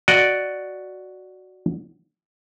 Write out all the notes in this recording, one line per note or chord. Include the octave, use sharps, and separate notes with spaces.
F#4 D5 D#5